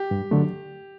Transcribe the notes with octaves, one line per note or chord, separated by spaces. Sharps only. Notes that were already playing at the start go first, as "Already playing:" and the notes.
Already playing: G4
G2
D3 F#3 A3